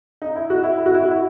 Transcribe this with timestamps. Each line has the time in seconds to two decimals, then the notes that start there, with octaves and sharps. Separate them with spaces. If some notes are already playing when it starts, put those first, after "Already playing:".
0.22 D#4
0.36 E4
0.50 F#4
0.63 E4
0.77 E4
0.86 F#4
0.94 E4
1.02 F#4
1.11 E4